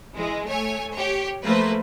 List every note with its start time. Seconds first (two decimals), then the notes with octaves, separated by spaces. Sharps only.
0.16 E3 G#3
0.48 A3 C#5 G#5
0.94 G4 C#5
1.42 F3 A3 A#3 B4 C5